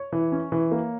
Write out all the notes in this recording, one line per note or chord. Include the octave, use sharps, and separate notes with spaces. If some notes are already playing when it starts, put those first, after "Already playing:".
Already playing: C#5
E3
C#4
E3
A#3